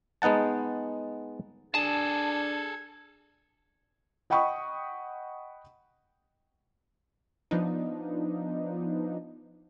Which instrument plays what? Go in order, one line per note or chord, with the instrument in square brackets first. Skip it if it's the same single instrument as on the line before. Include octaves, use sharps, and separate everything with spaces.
[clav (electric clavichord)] G#3 B3 D#4 F#5 A5
[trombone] D4 [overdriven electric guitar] G#4 A4 [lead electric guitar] A5 [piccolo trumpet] G#6
[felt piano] D#5 F#5 G5 B5 C#6 D#6
[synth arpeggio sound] F3 B3 D4 D#4